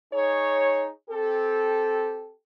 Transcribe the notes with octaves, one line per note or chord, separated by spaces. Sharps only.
D#4 G#4 C#5
C4 G4 A4